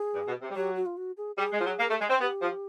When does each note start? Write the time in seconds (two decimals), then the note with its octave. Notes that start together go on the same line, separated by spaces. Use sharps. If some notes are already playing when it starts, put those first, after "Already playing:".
Already playing: G#4
0.14 G2
0.28 B2
0.42 C3
0.50 G3
0.56 F#3 G4
0.76 F#4
0.86 F4
0.97 F#4
1.17 G#4
1.38 G3 G#4
1.52 G#3
1.60 F3
1.65 F#3
1.79 A#3
1.90 A3
2.00 G#3
2.10 C4
2.21 B3 G4
2.42 F3